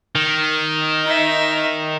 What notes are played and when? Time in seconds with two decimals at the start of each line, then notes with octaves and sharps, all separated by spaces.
0.16 D#3
1.04 D#4 E5